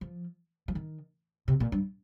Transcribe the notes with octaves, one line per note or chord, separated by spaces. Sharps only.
F3
F3
D#3
C3
A#2
G2